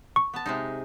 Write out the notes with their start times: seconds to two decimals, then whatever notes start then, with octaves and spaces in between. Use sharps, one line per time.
0.16 C#6
0.34 B3 A5
0.46 C3 G#3 D#4